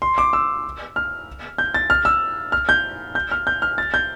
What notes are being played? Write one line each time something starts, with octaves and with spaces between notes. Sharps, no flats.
C6
D6
E6
F6
G6
A6
F6
E6
F6
G6
G6
F6
G6
F6
A6
G6